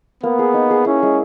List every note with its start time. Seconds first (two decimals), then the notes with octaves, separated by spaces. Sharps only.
0.23 A#3 B3
0.39 G#4
0.54 D#4
0.70 G#4
0.86 C#4 E4
1.03 G#3